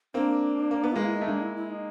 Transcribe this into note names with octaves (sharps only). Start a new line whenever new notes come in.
A#3 C4 D4
A#3
B3
G#3 A#3 F4
E4
D#4
A3
G#3 A#3 D4
E4
E4
D#4